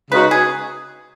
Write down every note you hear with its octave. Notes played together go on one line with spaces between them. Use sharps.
C#3 G#3 D#4 F#4 B4
G#4